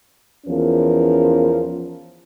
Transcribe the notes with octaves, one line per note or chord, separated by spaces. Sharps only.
E2 F3 C#4 A#4